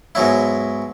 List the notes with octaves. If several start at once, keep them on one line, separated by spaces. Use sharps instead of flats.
G#2 B2 F#3 E4